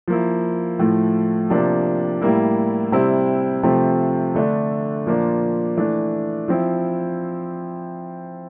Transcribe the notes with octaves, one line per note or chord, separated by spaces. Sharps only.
F3 A#3 E4
A2 F3 A3
C3 F3 A#3 D4
A2 G3 A#3 E4
C3 G3 C4 E4
C3 F3 A3 C4
D3 A3 D4
A#2 F3 A#3 D4
E3 A3 D4
F3 C4 E4